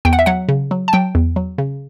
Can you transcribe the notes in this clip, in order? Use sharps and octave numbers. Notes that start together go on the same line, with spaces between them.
E2 G5
F#5
E5
F#3 F#5
C#3
F#3
A5
F#3 G5
E2
F#3
C#3